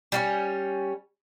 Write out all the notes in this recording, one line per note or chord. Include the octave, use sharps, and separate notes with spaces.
G3 A#3 C#4